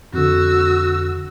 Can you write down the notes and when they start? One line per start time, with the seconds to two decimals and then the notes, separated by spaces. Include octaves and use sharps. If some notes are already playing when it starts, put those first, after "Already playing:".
0.13 F2 D3 F#4 E6